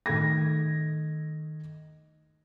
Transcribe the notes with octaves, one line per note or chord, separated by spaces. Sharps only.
D#3 A3 G#6 A#6